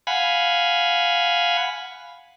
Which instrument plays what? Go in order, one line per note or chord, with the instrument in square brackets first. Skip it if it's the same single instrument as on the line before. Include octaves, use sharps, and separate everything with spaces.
[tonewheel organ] F5 F#5 G#5 B5